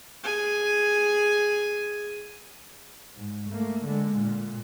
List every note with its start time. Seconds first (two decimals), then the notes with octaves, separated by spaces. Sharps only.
0.24 G#4 G#5
3.16 G#2
3.50 A3 A#3
3.84 D3 G#3
4.17 A#2